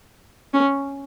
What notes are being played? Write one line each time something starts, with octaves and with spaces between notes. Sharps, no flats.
C#4